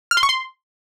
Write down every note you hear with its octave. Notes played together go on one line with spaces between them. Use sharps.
F6
C6
C#6
C6